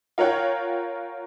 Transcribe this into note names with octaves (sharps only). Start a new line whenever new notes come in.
F4 A#4 C#5 F#5 G5